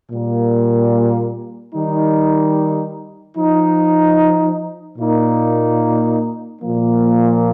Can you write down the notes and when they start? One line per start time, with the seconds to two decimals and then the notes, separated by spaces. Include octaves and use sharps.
0.11 A#2 G3 A#3
1.73 D#3 G3 D#4
3.37 F3 D#4
4.98 A#2 A#3 D#4
6.61 A#2 F3 A#3